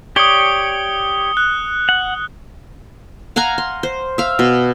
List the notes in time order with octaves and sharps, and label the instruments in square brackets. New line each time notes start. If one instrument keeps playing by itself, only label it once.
[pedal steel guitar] G4 C#5 D5 [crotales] D#6 C#7 G7
[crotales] F#6
[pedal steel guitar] F#5
[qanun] F5 F#5 G#5 A#5
C6
C5
E5 F5
B2